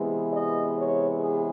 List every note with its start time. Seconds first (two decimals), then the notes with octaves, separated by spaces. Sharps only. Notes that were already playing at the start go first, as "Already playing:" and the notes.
Already playing: C3 E3 G#3 B3
0.33 D#5
0.77 C#5
1.21 G#4